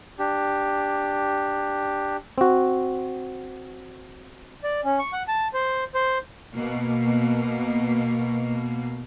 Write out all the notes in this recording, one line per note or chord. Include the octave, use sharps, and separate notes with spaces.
D4 G4
C4 F#4
D5
C#4
C#6
F#5
A5
C5
C5
B2 A#3